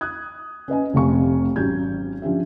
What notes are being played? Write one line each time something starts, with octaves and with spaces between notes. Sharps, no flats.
D#6 F#6 G#6
C#4 B4 D#5 G#5
F1 C3 A3 F5 G#5 C#6
G#1 F#3 C#4 G4 G6 G#6
F3 C#4 D4 G4 E5